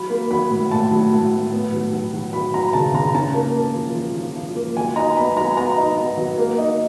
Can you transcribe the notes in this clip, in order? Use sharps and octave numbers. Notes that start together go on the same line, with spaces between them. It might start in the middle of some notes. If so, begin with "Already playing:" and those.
Already playing: F#3 B5
A#3
F#3 B5
A2
A2 A5
F#3
A2
A2
B3
F#3
F#3
F#3
F#3 B5
F#3 A#5
C#3 A5
C#3 A#5
C#4 A5
A#3
A#3
F3
F3
F3
F3
A#3
F#3 G#5
D#4 A#5
B3 B5
F#3 A#5
B3 A#5
D#4
B3
F#3
A#3
D#4